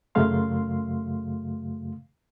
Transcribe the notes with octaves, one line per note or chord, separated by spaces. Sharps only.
F#2 C#3 F#3 A3 F5 C6